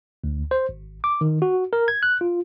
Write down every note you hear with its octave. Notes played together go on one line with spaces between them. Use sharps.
D2
C5
G#1
D6
D#3
F#4
A#4
G#6
F#6
F4